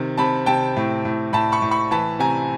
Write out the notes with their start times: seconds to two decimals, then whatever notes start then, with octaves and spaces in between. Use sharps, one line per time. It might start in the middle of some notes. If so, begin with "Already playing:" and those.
Already playing: C3 D#3
0.17 C3 A5 B5
0.46 C3 G5 A5
0.76 A2
1.05 A2
1.33 A2 A5 B5
1.52 B5 C#6
1.62 A2
1.71 B5 C#6
1.91 E3 A5 B5
2.19 C3 G#5 A#5